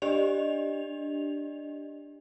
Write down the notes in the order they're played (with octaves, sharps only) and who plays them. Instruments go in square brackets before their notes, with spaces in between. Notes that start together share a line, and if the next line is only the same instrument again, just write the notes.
[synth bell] D4 G4 D5 D#5 F7